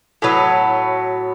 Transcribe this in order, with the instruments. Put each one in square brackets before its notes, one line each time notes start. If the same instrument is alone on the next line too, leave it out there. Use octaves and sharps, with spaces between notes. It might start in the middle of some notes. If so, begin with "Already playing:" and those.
[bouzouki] A2 F#3 B3